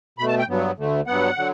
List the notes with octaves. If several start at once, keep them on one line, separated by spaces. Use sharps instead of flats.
B2 A3 B5
A5
G5
G2 F#3 B3
D2 D3 A3
G2 F#3 B3 F#5
D3 F#3